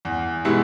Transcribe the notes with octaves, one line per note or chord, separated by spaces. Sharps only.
E2
B2 G#3 B3 E4